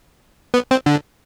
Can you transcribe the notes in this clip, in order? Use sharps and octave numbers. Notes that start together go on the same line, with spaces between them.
B3
C4
D3